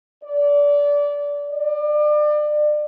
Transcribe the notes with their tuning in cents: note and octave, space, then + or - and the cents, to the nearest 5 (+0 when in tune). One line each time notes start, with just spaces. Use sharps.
D5 -25
D5 +30